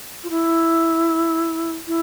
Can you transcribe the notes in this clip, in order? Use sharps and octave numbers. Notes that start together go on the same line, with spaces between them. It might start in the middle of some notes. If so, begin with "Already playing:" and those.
F4
E4
E4